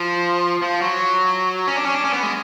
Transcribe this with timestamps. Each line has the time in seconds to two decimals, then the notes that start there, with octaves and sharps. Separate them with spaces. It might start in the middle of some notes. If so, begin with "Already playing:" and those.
Already playing: F3
0.62 F3
0.82 F#3
1.67 C#4
1.76 D4
1.85 C#4
1.94 D4
2.04 C#4
2.13 B3
2.23 G#3